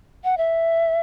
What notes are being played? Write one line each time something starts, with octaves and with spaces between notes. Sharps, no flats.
F#5
E5